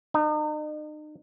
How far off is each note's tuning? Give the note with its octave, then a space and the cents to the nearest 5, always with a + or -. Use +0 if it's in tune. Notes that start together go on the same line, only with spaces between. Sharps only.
D#4 -40